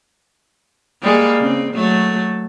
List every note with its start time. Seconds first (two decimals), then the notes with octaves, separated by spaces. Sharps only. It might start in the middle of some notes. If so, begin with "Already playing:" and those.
1.02 G3 G#3 A#3
1.39 C#3 C4
1.74 F#3 A3